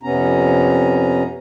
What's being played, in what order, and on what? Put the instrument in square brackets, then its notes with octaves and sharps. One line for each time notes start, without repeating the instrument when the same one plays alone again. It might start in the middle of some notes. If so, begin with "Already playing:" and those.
[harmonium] F2 C3 B3 C#4 A#5